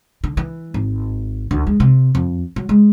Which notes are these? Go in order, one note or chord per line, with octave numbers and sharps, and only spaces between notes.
D3
E3
G#1
D2
G#3
C3
F2
F#3
G#3